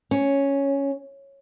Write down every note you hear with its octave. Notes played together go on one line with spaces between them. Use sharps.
C#4